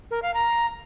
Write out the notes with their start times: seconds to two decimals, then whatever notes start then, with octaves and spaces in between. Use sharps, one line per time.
0.11 A#4
0.22 F5
0.34 A#5